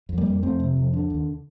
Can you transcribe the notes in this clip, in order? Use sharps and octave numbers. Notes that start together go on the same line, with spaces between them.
F2
G3 A#3
F2
F2 A3 C4
C3
F2
D3
D#2